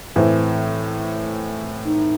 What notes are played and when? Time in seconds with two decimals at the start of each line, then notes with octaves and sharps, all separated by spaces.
0.16 A2 E3 C4
1.85 D#4